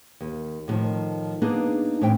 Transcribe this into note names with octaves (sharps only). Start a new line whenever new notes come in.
D#2
A2 D3 D#3 F3
A#3 B3 D4 D#4 G#4
A2 E3 A3 C4 G5